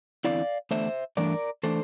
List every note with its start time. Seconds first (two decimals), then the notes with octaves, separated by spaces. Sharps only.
0.24 E2 D3 A3 C4 E4 D5 F5
0.71 E2 D3 A3 C5 E5
1.17 G2 E3 A3 D4 A#4 D5
1.63 E3 A3 D4 A4 C5